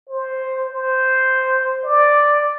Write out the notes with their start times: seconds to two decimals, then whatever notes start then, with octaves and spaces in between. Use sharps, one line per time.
0.09 C5
0.68 C5
1.85 D5